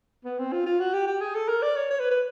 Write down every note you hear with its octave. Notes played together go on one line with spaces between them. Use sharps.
B3
C4
F4
F4
F#4
G4
G4
G#4
A4
A#4
D5
C#5
C#5
B4
B4